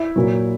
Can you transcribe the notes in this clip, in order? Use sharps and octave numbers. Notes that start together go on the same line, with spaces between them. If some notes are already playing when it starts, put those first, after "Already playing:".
Already playing: E4
A#2 F#3